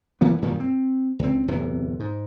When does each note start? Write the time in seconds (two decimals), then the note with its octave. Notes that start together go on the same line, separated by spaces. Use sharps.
0.21 F1 E3 A#3 B3
0.42 F#2 A#2 D#3 G3
0.60 C4
1.19 C#2 C4
1.48 D1 E2 C3 E3
2.00 G#2